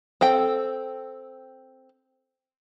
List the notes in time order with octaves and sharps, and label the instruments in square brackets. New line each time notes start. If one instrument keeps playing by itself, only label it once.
[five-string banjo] C4 A4 G5